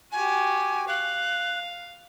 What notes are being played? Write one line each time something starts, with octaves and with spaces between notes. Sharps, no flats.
F#4 G4 G#5
F5 F#6